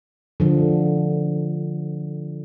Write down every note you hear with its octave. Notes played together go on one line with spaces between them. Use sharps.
D3 F3